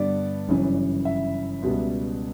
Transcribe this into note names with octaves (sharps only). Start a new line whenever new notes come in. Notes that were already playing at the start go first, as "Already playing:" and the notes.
Already playing: G2 D3 G3 B3 D5
G1 F#2 C#3 E3
E5
C#2 B2 G3 B3